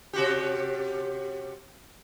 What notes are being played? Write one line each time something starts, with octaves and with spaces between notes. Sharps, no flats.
C3 F#4 G4